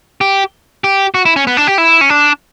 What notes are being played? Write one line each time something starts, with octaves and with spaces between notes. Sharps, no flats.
G4
G4
F#4
E4
C#4
B3
D4
G4
E4
C#4
D4